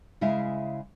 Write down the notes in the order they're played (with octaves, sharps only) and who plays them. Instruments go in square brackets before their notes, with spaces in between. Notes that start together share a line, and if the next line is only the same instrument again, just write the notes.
[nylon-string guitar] C#3 G#3 E4 E5 F5